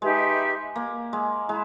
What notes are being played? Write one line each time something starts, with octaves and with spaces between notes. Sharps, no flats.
G#3 D#4 G4 B4 E5
A#3
G#3
G#3 E4